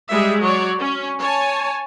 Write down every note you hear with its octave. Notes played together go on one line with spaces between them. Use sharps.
G3 G#3 G#4 E5
F#3 C#5 D5
C#4
C#5 G#5 A5